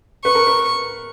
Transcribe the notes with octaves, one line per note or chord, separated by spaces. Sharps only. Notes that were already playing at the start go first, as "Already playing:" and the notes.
B4 C#6
A#4
B4